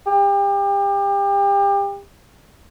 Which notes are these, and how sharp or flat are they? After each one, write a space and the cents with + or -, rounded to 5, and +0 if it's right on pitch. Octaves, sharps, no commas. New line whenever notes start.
G4 +30